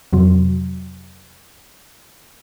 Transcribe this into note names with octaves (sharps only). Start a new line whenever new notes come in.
F2 C3 F#3